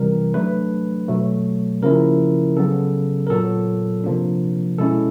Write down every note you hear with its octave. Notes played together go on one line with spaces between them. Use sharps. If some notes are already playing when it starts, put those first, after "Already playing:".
Already playing: C3 E3 G3 A#4
F#3 A3 D4 B4
B2 F#3 A3
C#3 F3 A#3 C#4 E4 A#4
C#3 F#3 B3 A4
A#4
A#2 F#3 B3 A4
C3 F3 A#3 D4
B2 G#3 C#4 E4 A4